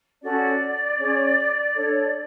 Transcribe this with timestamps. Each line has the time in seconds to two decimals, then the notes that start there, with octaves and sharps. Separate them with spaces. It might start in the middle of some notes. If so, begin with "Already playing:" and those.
0.22 C#4 F#4 A4 D5
0.98 C#4 G#4 C#5
1.75 D4 A4 C#5